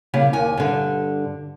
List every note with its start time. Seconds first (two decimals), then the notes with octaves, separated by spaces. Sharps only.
0.14 C#3 G3 A#3
0.33 D#2 G#5
0.57 G2 D3